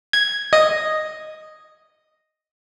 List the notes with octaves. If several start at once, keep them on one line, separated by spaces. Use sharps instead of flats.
G#6
D#5